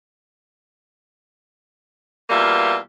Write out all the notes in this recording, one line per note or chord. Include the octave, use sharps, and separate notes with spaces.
E2 B2 G3 A#3 F4 E5